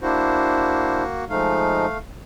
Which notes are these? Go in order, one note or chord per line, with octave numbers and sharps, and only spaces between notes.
A#3 D4 E4 F#4 C5
F3 G#3 A3 D#4 F5